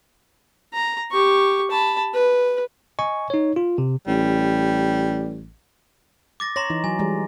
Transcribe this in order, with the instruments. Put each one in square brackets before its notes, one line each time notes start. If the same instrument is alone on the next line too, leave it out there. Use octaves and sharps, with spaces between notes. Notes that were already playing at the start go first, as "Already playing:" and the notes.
[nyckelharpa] A#5
G4 C#6
A5 B5
B4
[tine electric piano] D#5 G#5 C#6
D#4 C#5
F4
C3
[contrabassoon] A1 [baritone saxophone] G3
[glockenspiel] D6 A6 A#6
[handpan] C#5 [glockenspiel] A#5 C6 A#6
[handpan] E3 D#4
[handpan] F#3 [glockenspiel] G#5
[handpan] E3 G3 G#3